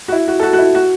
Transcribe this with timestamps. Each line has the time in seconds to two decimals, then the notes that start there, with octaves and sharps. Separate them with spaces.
0.08 F#4
0.12 E4
0.28 F#4
0.39 A4
0.43 F#4
0.53 F#4
0.58 E4
0.75 F#4